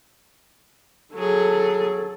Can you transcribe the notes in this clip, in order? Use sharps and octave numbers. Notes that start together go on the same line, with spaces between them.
F#3 G#4 A4